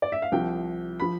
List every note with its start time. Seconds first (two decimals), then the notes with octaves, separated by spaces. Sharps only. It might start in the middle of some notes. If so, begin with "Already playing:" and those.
0.02 D5
0.12 E5
0.22 F5
0.32 C2 C3 F3 G5
1.00 F3 B5